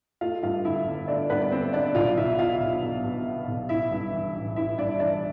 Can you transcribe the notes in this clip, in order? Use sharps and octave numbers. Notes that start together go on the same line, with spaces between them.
A3 F4 F5
G2 F4 F5
D3 E4 E5
G1
A3 D4 D5
G2 B3 B4
D5
D3 C4 C5
G1 D4 D5
B1 F4 F5
B2 E4 E5
B3 F4 F5
B1
B1
B2
B3
B1
A1 E4 E5
G2
E3
A1
A1 E4 E5
G2 D4 D5
E3 D4 D5